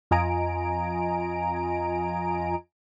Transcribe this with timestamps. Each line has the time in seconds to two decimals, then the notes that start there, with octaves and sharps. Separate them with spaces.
0.11 F2 F4 D#5 G#5 A#5 D7